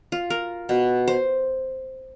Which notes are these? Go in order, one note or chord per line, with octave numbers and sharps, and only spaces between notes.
F4
A#4
B2
C5